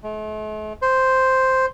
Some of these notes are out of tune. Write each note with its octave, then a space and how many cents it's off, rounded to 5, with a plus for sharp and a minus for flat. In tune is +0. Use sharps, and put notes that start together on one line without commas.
A3 -45
C5 +0